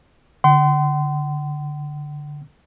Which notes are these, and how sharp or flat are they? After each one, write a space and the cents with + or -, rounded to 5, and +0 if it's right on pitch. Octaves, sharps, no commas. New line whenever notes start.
D3 -5 F#5 +45 C6 -25